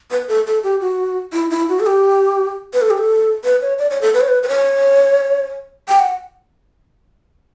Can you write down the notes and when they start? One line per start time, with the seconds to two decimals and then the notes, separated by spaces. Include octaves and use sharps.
0.11 B4
0.28 A4
0.47 A4
0.64 G4
0.81 F#4
1.33 E4
1.50 E4
1.69 F#4
1.80 A4
1.86 G4
2.73 B4
2.82 A4
2.90 G4
2.98 A4
3.44 B4
3.61 C#5
3.79 D5
3.91 C#5
4.02 A4
4.14 B4
4.21 C#5
4.28 B4
4.43 B4
4.48 C#5
5.88 G5
6.00 F#5